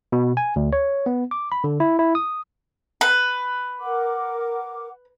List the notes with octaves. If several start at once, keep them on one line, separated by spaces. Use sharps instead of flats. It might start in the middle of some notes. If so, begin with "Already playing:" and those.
B2
G#5
D2
C#5
B3
D6
B5
D3
E4
E4
D#6
B4
A#4 F#5 D6